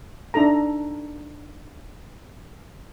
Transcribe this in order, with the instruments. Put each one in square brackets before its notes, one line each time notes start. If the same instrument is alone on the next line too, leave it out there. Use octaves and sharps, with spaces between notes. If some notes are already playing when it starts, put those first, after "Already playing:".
[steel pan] D4 D#4 A4 A#5